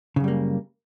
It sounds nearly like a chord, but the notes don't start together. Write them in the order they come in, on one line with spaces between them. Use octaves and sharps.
C#3 F#2 G3 A#3